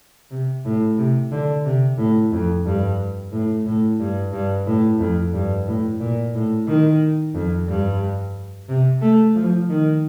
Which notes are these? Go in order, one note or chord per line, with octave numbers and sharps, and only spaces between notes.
C3
A2
C3
D3
C3
A2
F2
G2
A2
A2
G2
G2
A2
F2
G2
A2
A#2
A2
D#3
F2
G2
C3
A3
F3
D#3